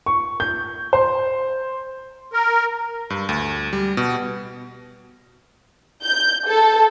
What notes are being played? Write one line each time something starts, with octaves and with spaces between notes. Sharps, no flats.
C#6
G6
C5
A#4
G2
D2
G3
B2
G6
A4